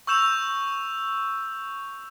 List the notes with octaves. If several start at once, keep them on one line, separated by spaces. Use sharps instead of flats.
C#6 E6 G6 E7 F7